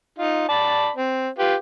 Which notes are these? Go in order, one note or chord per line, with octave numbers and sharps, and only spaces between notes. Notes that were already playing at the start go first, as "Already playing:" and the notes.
D#4 F4
D5 A5 B5
C4
F4 G4 B4